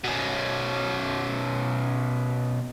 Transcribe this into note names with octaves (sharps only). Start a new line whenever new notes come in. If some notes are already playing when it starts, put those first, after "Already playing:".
B2 C#4